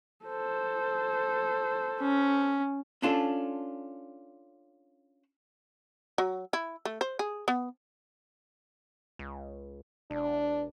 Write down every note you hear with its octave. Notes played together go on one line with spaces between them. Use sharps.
A4 C5
C#4
C#4 D4 F4 A4
F#3
E4
A3
C5
G#4
B3
C#2
E1 D4